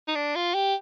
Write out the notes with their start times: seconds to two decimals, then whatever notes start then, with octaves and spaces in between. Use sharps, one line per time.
0.08 D#4
0.16 D4
0.36 F4
0.55 G4